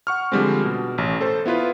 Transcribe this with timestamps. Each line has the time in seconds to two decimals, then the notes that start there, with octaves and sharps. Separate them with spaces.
0.07 F#5 C#6 F6
0.32 D3 F3 G3 G#3 C4
0.64 B2
0.98 A1
1.21 A4 C5
1.45 B3 E4 F4 B4